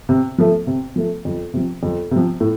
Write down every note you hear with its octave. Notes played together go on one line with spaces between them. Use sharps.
C3
F3 A3
C3
F3 A3
F2
C3 F3
F2
C3 F3
A2